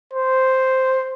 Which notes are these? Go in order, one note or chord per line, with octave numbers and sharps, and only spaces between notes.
C5